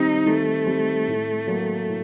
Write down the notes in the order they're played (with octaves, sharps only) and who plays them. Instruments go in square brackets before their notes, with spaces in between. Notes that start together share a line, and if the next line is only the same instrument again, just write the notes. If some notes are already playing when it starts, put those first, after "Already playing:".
Already playing: [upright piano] D#3 G3 C4 [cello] D#4
[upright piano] D#3 [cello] A3
[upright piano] G3 C4
A2
F#3 A#3
A2